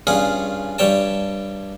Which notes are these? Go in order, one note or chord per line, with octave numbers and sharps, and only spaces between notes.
G2 C#4 F4 G#4 F#5
G2 G3 C#5 G5 A5